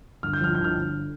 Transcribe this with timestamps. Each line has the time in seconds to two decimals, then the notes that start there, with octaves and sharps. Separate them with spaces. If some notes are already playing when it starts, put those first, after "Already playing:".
0.23 G1 F6
0.33 G6
0.41 F3 F6
0.55 G1 G6
0.64 F6